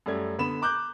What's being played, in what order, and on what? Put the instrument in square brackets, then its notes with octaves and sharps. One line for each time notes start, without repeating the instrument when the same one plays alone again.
[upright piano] F#2 G3 A3 G#6
D3 B3 B5 E7
A#5 D6 F#6 G6